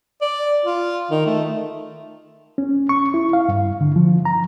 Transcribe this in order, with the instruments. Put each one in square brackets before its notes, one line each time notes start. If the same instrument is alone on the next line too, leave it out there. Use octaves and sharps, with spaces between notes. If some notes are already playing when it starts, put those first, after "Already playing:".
[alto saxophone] D5
F4
D#3
A3
[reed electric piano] C#4
C#6
E4
F5
G2
D3
F3
A#5